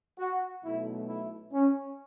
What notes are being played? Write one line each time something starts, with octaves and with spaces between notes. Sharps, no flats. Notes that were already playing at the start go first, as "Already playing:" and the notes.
F#4
B1 B2 A3 E4
E4
C#4